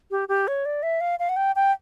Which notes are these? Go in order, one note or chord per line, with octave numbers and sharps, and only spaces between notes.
G4
G4
C#5
D5
E5
F5
F5
F#5
G5
G5